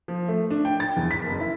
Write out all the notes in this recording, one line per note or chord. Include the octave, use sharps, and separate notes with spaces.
F3
A3
D4
G5
A6
E2
B6
F#1
E4